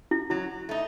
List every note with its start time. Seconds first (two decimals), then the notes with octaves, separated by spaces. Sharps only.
0.11 E4
0.30 F#3 E4
0.69 A3 D#4